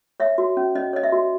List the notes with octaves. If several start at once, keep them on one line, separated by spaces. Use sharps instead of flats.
C#5 E5
F#4
C#4
C#4 D#5
C#5 D#5
E5
F#4